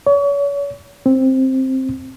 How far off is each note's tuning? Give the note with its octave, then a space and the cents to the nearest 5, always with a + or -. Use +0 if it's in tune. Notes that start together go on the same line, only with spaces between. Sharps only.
C#5 +35
C4 +5